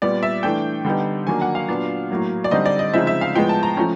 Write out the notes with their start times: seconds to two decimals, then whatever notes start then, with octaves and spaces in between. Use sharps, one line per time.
0.02 A#2 G3 B3 D5
0.23 E5
0.43 E3 A3 D4 G5
0.85 D3 G3 B3 D#4
1.27 D#3 F#3 A#3 D4 G#5
1.41 F#5
1.55 F5
1.68 A#2 F#3 B3 D4
2.10 A2 F#3 A#3
2.44 D5
2.51 D3 G3 C4 D#4 D#5
2.66 D5
2.79 D#5
2.94 C#3 F3 G#3 C4 D#4 E5
3.07 E5
3.21 F5
3.35 A2 F3 G#3 B3 G5
3.49 A5
3.63 A#5
3.77 F3 A3 C#4 A#5